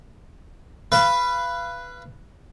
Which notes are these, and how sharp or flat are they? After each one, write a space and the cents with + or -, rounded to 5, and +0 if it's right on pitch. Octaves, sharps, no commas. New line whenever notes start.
B4 +0 F5 -30